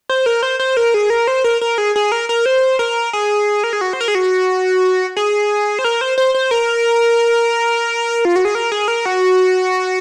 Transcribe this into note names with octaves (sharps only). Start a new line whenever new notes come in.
C5
A#4
C5
C5
A#4
G#4
A#4
C5
A#4
A#4
G#4
G#4
A#4
A#4
C5
A#4
G#4
A#4
G#4
F#4
C5
A#4
G#4
F#4
G#4
C5
A#4
C5
C5
C5
A#4
F4
F#4
G#4
A#4
G#4
A#4
F#4